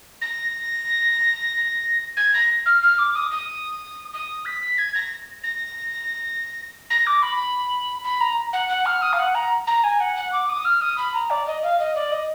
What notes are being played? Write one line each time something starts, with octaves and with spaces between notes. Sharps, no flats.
A#6
G#6
A#6
F6
F6
D6
D#6
D#6
D#6
B6
G#6
A#6
A#6
A#6
D6
B5
B5
A#5
F#5
F#5
F6
D#6
F5
F#5
A#5
A#5
G#5
F#5
F#5
D6
D#6
F6
D#6
B5
A#5
D5
D#5
F5
D#5
D5
D#5